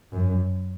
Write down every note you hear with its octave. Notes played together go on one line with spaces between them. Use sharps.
F#2